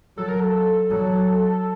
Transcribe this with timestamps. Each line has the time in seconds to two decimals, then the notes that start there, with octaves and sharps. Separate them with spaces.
0.18 F#3 A4
0.28 A#4
0.40 A4
0.90 F#3